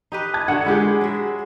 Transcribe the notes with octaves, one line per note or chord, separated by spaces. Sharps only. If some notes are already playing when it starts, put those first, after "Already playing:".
D#4 G4 B4
A5 G#6
D3 F#4 F#5
G#3 E4 G4 G#4 A#4
F#3 E5